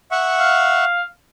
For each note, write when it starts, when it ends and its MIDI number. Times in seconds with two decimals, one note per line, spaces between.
0.11 0.85 76
0.11 0.85 78
0.11 0.85 85
0.39 1.03 77